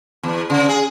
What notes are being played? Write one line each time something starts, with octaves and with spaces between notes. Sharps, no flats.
E2
C#3
G#4